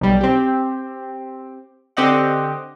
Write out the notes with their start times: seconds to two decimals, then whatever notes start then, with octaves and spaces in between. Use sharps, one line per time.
0.01 B1 G3
0.21 C4 G4
1.97 D3 C4 G4 D#5 F#5